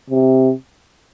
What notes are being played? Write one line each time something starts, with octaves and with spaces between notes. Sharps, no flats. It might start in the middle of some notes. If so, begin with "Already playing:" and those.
C3